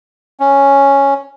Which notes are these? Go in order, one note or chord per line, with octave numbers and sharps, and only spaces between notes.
C#4